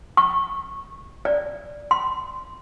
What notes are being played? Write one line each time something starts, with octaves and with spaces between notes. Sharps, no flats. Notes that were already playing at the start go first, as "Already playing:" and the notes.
C#6
D5
C6